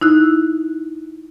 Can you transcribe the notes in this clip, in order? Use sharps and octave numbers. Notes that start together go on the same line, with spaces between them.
D#4 E4 F#6